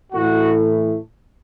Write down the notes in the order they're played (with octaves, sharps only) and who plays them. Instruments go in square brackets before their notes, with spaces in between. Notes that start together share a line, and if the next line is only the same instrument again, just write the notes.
[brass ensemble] A2 E3 A3 F#4